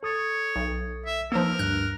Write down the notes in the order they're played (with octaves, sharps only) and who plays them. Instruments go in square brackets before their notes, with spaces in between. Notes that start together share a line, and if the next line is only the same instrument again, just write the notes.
[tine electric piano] A4 D#6 A6 [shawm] C#5
[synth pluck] B1
[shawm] E5
[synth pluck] F3 A#3 [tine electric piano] D#4 B4 E6 [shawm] A#4
[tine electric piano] D2 G2 [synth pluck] F#6